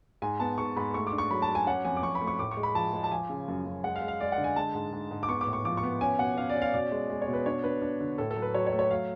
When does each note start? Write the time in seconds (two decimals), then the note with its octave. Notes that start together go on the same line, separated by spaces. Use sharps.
0.22 G#2 G#5
0.40 B3 A5
0.58 G#2 C#6
0.76 G#2 B5
0.94 A3 C#6
1.07 D6
1.12 D4
1.18 C#6
1.30 F#3 B5
1.42 A5
1.48 F#3
1.55 G#5
1.67 C#4 F#5
1.85 F2 G#5
1.97 D6
2.03 F2 C#6
2.15 B5
2.21 A3
2.27 C#6
2.39 A2 D6
2.51 C#6
2.57 G#3
2.63 B5
2.75 F3 A5
2.94 G#3
3.04 A5
3.11 F3 G#5
3.30 C#3
3.48 F#2
3.66 F#2
3.84 G#3 F#5
3.96 F5
4.02 G#3
4.08 F5
4.20 G#3 D5
4.32 F#5
4.38 D3
4.44 G#5
4.56 G#3 A5
4.75 G#2
4.93 G#2
5.11 G#2
5.23 D6
5.28 B3 C#6
5.41 D6
5.47 A2
5.53 C#6
5.65 F3 D6
5.77 C#6
5.83 B3
6.01 C#4 G#5
6.19 B2 F#5
6.37 C#4 F5
6.49 D5
6.55 C#4
6.62 F5
6.74 B2 D5
6.92 G#3
7.10 G#3
7.22 C#5
7.28 B2
7.33 B4
7.46 D4 C#5
7.64 D4 B4
7.82 D4
8.00 D3
8.18 A2 A4
8.31 A4
8.36 F#3
8.42 B4
8.54 F#3 C#5
8.67 C#5
8.73 A3
8.79 C#5
8.91 F#3 F5